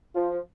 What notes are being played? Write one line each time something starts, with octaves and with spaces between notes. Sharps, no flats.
F3 F4